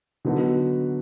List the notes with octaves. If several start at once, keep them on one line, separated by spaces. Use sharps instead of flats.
D3 F#3 B3 D#4 F#4